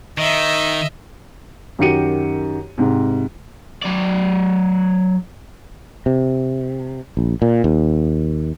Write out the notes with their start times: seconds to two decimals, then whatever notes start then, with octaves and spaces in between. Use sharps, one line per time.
0.18 D#3 D#5 E5
1.79 F#2 D#3 F#4 G4 C#7 D#7
2.78 G#2 C3
3.82 F#3 D5
6.06 C3
7.17 A#1
7.42 A#2
7.64 D#2